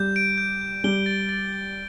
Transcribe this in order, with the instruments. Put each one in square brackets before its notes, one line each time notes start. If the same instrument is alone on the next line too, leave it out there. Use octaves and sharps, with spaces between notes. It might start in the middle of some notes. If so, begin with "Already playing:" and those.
Already playing: [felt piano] G3 [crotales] G6
[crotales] D7
G6
G6
[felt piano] G3 [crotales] G7
[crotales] A6
A6
G7